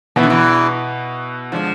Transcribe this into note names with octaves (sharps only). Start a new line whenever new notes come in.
B2 E3 B3 E4
D3
E2 E3
D3 F3 G#3 D4